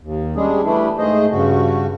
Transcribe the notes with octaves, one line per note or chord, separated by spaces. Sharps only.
D#2
G3 G#3 C#4 D4 G#4
E3 G3 A3 D4 E4
G#2 A3 G#4 C5 D#5
G2 C#3 F#4